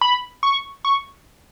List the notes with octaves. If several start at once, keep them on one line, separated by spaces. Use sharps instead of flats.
B5
C#6
C#6